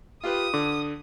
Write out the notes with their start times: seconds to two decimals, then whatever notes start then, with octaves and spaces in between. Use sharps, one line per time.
0.24 F4 G4 B4 D#6
0.54 D3 D6